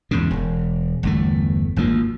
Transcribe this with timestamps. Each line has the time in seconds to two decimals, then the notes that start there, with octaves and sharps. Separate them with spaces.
0.11 E2 G#2 C#3
0.31 E1
1.03 G1 E2 A3
1.76 G#1 D2 F3 A#3